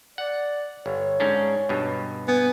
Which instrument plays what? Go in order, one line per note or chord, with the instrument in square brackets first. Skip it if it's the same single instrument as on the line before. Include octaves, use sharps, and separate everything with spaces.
[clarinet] D5 [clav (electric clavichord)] F#5
[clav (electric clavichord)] G1 [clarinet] C#5
[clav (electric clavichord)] G#2 C#4 D4
G2 B2
[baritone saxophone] B3 [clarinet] G#5